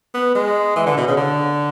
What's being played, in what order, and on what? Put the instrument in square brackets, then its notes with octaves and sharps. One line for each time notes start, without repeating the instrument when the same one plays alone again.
[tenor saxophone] B3
G#3
E3
D3
B2
C#3
D3